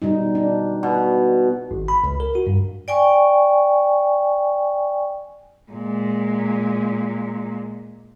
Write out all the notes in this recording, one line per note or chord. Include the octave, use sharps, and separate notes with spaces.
B2 G3 D#4
D4
B2
G#1
B5
C#2
A#4
F#4
G2
D5 G5 G#5 C#6
A#2 G#3